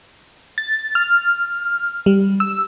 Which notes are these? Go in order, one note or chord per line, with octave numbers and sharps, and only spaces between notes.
A6
F6
G3
E6